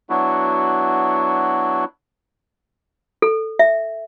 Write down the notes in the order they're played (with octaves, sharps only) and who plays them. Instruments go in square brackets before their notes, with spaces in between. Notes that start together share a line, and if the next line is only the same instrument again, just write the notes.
[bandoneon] F#3 B3 D4 E4 F#4
[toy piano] A4
E5